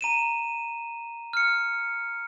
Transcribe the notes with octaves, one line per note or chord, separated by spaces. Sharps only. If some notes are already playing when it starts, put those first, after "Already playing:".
A#5 D#7 E7
F6 C#7